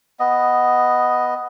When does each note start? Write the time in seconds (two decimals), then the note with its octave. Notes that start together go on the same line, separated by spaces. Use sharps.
0.20 B3 D#5